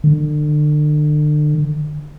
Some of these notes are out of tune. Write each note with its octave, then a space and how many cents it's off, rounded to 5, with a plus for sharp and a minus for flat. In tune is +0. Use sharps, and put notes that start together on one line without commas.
D3 +35